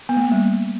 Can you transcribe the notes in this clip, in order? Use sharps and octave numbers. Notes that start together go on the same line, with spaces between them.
B3
A3
A#3
G3